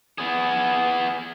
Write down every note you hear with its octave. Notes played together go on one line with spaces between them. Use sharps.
B3 G#4